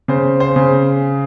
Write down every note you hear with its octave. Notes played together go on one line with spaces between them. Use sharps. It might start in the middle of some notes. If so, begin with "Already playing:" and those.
C#3 C5
C5
C#3